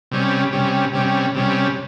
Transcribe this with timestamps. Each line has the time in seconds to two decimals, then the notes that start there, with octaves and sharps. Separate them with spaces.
0.11 C3 G3 C#4
0.53 C3 G3 C#4
0.94 C3 G3 C#4
1.35 C3 G3 C#4